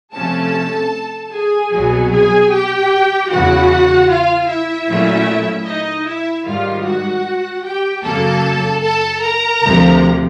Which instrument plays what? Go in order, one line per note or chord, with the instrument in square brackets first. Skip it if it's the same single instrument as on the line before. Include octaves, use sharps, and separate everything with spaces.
[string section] C3 F3 A3 C#4 A4 A5
G#4 G#5
C2 B2 F#3
G#4 G#5
G4 G5
E2 C#3 E3 F#4 F#5
F4 F5
E4 E5
A#2 F#3 A3 C#4
D#4 D#5
E4 E5
G#2 D#3 G3 F4 F5
F#4 F#5
G4 G5
F#2 C#3 F#3 A#3 A4 A5
A4 A5
A#4 A#5
D2 C3 F3